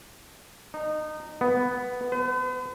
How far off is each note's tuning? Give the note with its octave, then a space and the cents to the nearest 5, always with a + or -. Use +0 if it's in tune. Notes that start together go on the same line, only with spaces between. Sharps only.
D#4 -20
B3 +5
B4 +45